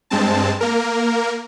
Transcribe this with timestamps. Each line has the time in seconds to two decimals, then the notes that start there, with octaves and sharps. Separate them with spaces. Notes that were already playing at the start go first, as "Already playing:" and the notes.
0.10 G2 G#3 C4 A5
0.61 A#3 A#4